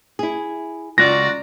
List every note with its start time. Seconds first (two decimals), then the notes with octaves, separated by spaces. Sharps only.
0.19 E4 G#4
0.98 C#2 F4 F#4 D5 A#5 A#6